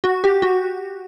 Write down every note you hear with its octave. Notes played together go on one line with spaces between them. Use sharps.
F#4
G4
F#4